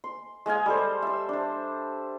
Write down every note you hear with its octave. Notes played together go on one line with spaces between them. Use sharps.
C6
G#3 D#5 F5 G#5
G3 A4 C5
E5 C6
D4 C5